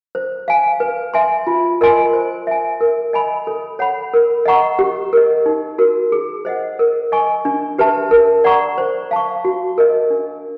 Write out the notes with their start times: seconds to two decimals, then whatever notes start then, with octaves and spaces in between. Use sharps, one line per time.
0.15 C5
0.48 F5 G#5
0.80 B4
1.14 E5 G#5 C6
1.47 F4
1.81 A#4 D#5 G#5 C6
2.13 C5
2.47 E5 G#5
2.81 A#4
3.13 D#5 G#5 B5
3.47 A4
3.79 C#5 F#5 B5
4.14 A#4
4.46 D#5 F#5 A#5 C#6
4.79 G4
5.13 A#4 D#5
5.46 D#4
5.78 F#4 A#4
6.12 G#4
6.45 C5 D#5 F#5
6.79 A#4
7.12 D#5 G#5 C#6
7.45 D4
7.78 G4 B4 E5 A5
8.11 A#4
8.44 D5 F#5 A#5 C#6
8.78 C5
9.11 F5 A5 C#6
9.45 F#4
9.78 A#4 D#5
10.10 D4